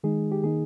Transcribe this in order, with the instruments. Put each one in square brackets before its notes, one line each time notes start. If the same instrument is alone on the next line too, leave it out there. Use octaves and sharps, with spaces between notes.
[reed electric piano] D#3 G#3 D#4 G#4
G4
D#3 A#3 D#4 G#4